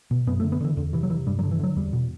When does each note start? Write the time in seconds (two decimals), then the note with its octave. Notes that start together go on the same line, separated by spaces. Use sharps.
0.11 B2
0.27 F#2 B3
0.40 A3
0.44 D3
0.52 B3
0.61 D3 E3
0.77 E2 D3
0.93 C3 E3
1.03 F#3
1.10 C3 E3
1.26 G2 G3
1.39 F#3
1.43 D3
1.51 E3
1.60 D3 F#3
1.76 E2 G3
1.93 B2